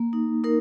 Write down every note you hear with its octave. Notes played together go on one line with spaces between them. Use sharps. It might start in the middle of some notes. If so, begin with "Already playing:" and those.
Already playing: A#3
D#4
D#4 A#4